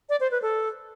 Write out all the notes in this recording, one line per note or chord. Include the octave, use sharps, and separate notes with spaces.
D5
C5
B4
A4